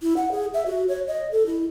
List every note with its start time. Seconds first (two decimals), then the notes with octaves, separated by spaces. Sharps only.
0.02 E4
0.17 F#5
0.32 G#4
0.54 E5
0.66 F#4
0.88 C#5
1.08 D#5
1.32 A4
1.46 E4